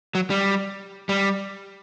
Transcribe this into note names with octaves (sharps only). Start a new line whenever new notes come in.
F#3
G3
G3